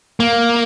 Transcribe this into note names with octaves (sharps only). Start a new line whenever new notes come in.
A#3